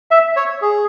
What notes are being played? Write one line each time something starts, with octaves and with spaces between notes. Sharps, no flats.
E5
C#5
G#4